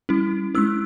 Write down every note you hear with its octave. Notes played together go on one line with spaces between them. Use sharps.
G3 C#4 E4
G#3 C#4 E4 E6